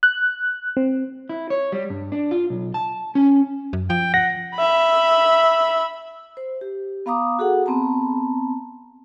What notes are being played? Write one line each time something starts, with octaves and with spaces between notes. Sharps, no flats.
F#6
C4
E4
C#5
G3
G2
D4
F4
B1
A5
C#4
F#2
F3 G5
F#5 A#6
E5 B5
C5
G4
B3 F5 A#5 D6 D#6
F#4 G#4 A4 F#5
B3 C4 A5 A#5